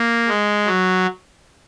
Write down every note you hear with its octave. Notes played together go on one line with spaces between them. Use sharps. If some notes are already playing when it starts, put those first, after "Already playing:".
Already playing: A#3
G#3
F#3